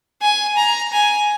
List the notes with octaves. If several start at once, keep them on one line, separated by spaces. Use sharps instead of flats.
G#5
A#5
G#5